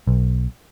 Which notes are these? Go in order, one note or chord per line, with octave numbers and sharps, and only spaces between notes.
B1